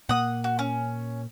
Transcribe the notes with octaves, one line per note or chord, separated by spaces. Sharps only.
A#2 A#3 F#5 D#6
F#4
C#4